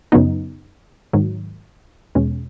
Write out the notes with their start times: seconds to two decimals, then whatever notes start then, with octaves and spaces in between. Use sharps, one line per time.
0.12 F#2 C#3 F#3 B3 D#4
1.13 G#2 D#3 F#3
2.15 E2 B2 G#3 C#4